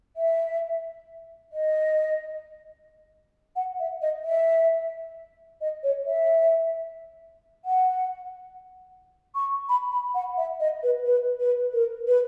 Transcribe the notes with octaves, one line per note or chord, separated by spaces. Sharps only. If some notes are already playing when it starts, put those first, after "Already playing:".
E5
D#5
F#5
E5
D#5
E5
D#5
C#5
E5
F#5
C#6
B5
B5
F#5
E5
D#5
B4
B4
B4
A#4
B4